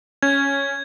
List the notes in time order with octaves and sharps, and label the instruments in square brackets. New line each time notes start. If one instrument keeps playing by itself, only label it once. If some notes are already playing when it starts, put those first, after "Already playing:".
[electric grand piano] C#4 [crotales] G#6